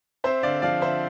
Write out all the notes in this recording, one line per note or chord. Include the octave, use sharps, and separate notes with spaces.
C4 C5 E5
D3 D5 F5
F3 D5 F5
D3 C5 E5